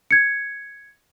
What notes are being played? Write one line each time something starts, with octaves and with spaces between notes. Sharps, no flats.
G#6 C#7